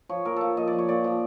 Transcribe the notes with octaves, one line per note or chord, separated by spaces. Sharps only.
F3 C#5
A#2 A#4
F3 A4
A#2 D#5
D5
F3
C#5
A#2 D5
F3